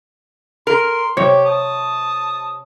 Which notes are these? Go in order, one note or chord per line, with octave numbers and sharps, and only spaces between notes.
A#4 C6
C3 G4 C#5
A5 D#6